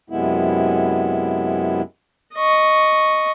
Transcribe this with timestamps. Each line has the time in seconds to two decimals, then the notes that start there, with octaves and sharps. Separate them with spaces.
0.10 F#2 C3 G#3 B3 E4
2.35 D#5 C#6